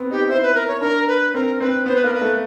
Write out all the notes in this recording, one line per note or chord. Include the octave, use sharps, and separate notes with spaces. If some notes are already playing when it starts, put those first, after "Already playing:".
Already playing: B3 C4
D#4 G4
E4 C5
B4
A#4
C#5
D4 A#4
B4
C4 A#4
C4 B4
B3 C5
B4
A#3 A#4
B4
A3